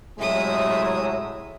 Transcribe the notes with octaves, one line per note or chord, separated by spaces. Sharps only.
A2 C3 F#3 G#3 E5 D#6